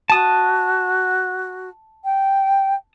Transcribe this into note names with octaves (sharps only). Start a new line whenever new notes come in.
F#4 A5 D#6
G5